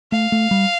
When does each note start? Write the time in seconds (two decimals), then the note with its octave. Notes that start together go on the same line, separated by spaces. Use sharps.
0.12 A3 F5
0.32 A3
0.51 G3